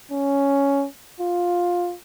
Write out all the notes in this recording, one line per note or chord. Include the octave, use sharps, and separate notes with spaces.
C#4
F4